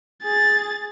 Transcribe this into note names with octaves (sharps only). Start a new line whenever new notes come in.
G#4 A6